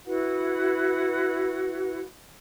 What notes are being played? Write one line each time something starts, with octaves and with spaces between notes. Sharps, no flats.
E4 F#4 B4 F#5